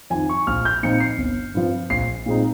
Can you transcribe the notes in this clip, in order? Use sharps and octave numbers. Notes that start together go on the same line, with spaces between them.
F2 D#3 G#5
C#6
A#1 F6
G6
A#2 F3 C4 D#4 C#7
C7
G1
G2 F3 C4
A#1 C7
A#2 G#3 C4 D#4